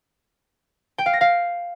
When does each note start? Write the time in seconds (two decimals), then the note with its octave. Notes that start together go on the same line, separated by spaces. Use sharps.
0.98 G5
1.06 F5
1.13 A#6
1.21 F5